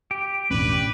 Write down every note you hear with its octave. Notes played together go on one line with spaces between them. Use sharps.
G4
E1 A1 A2 C#4 D4 B4